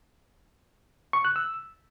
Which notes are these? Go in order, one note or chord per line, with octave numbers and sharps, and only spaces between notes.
C#6
F#6
E6